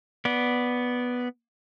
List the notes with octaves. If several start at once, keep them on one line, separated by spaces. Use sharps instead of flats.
B3 D5